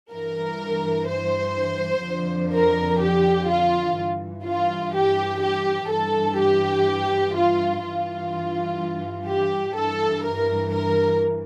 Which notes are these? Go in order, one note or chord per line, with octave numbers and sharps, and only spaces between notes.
G2 E3 A#4
C5
F2 D3 F3
A#4
G4
F4
G2 E3
F4
G4
G4
G2 E3 A4
G4
F4
G2 E3 F4
G4
G2 E3 A4
A#4
A#4